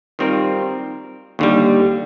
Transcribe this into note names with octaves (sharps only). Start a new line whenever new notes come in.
D#3 G3 C4 F4 A#4
D#2 D3 G3